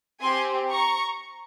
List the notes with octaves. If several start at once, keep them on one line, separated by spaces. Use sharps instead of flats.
C4 G4 G#5 C6
A#5 C#6